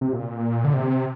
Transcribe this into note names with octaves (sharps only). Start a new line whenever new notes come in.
C3
A#2
D3
C3